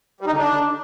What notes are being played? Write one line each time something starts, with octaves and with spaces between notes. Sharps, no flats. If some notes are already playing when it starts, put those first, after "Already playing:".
G3
D#4
D3
D4